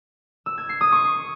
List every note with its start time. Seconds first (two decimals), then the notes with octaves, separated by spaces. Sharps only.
0.46 E6
0.58 G#6
0.69 C7
0.81 D#6
0.92 C#6